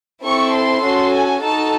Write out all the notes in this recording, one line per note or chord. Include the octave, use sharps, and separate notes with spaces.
C4 E4 A4 C#6
C6
C#4 F#4 A4
G#5
D#4 F#4 A4 A5